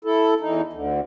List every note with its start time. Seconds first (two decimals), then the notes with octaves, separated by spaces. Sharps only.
0.04 E4 A4
0.40 E2 E3 D#4
0.73 D2 D3